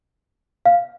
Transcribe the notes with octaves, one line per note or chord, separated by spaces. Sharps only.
F5